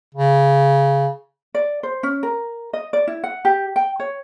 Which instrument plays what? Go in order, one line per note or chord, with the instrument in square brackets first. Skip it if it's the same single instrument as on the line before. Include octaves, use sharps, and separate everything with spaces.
[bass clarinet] C#3
[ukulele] D5
C5
C#4
A#4
D#5
D5
E4
F#5
G4
G5
C#5